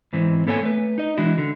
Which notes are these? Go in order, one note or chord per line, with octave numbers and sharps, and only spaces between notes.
G#2 E3 C4
A#3 B3 A4 C#5 F#5 G#5
A3 B4
D#4 D#5
E3 G#3 D4 E4 F#4
D3